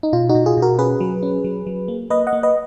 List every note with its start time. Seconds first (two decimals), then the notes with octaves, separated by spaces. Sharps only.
0.03 D#4
0.13 B2 F4
0.29 D#4 F#4
0.35 B2
0.46 F4 G#4
0.57 B2
0.62 F#4 A#4
0.79 C#4 G#4 B4
1.00 F#3
1.23 C#4
1.44 F#3
1.67 F#3
1.88 A#3
2.10 A#3 B4 D#5
2.27 D#5 F#5
2.33 A#3
2.43 B4 D#5